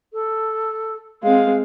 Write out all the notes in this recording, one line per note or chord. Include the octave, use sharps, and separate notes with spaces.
A4
G#3 C4 F5